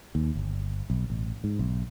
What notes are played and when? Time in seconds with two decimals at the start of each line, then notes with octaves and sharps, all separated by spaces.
0.15 D#2
0.35 G1
0.90 B1
1.10 A1
1.44 G#2
1.59 B1